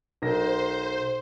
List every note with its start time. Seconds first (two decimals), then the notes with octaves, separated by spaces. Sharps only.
0.22 B1 A#4 C5 A#6